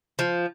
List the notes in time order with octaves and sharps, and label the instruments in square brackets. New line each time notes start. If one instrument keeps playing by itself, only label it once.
[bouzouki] F3